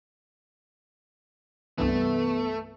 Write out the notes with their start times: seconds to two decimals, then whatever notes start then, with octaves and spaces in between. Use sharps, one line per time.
1.78 C2 G2 E3 A3 B3